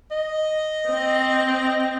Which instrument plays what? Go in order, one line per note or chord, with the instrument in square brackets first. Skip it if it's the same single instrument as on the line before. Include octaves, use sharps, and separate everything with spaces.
[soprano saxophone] D#5
[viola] C4
[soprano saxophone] D#5